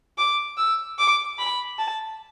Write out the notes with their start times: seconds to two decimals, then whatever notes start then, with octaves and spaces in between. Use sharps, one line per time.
0.18 D6
0.57 E6
0.99 D6
1.39 B5
1.79 A5